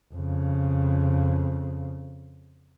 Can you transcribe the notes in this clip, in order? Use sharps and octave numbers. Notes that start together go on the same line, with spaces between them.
F2 C#3